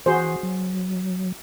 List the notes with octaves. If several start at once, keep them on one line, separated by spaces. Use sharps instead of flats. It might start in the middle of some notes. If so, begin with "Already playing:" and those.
E3 F#4 G#4 C5
F#3